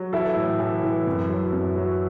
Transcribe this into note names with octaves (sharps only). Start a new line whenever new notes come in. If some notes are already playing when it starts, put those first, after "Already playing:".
Already playing: F#3
E3 E4 A4
A2
E3
E3
F#2
F#3
F#2
F#3